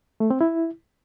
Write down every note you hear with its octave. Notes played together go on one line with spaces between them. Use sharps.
A3
C4
E4